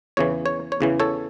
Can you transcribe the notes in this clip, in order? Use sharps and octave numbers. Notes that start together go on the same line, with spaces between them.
E2 C#3 E3 C#5
C#5
C#5
E2 C#3 E3
A4 C#5